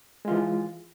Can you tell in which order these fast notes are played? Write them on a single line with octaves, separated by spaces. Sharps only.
G#3 F4 E3